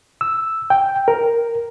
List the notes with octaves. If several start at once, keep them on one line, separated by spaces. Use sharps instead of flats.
E6
G5
A#4